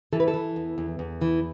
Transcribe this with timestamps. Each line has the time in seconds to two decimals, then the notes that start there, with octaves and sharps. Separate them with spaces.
0.13 E3 A4
0.20 B4
0.28 A4
0.34 E3
0.56 E2
0.78 E2
0.99 E2
1.22 E3